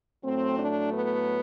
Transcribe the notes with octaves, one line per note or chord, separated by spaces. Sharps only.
A2 F#3 A3 C4
D4
B3